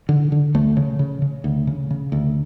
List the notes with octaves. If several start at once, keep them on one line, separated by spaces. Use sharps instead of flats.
D3
D3
D2 A3
C#3
C#3
C#3
D2
C#3
C#3
D2